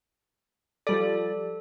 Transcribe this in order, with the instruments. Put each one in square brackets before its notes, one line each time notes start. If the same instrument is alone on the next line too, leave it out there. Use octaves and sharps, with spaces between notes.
[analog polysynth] F3 G3 D5 [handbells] A4